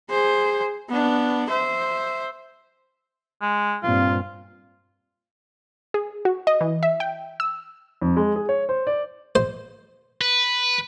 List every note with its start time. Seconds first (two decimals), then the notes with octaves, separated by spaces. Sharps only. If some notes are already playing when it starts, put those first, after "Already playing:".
0.10 G#4 C5
0.90 B3 D4
1.50 C5 E5
3.42 G#3
3.83 G2 A#2 C4 F4
5.94 G#4
6.25 F#4
6.47 D#5
6.61 E3
6.83 E5
7.00 G5
7.40 E6
8.02 F2
8.17 G#3
8.36 G#4
8.49 C#5
8.69 C5
8.87 D5
9.35 C5
10.21 B4